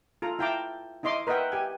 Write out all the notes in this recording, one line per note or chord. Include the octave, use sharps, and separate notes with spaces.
F4 A4 A#5
E4 F5 G5 A5 A#5 D6
D#4 E4 D#5 C6 D6
A#4 B4 D#5 E5 F#5 G5
G4 G#5